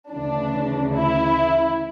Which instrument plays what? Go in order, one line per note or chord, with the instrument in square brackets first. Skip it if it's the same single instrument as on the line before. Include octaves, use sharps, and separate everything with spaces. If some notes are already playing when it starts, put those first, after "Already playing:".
[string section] D2 C#3 E3 D4
E4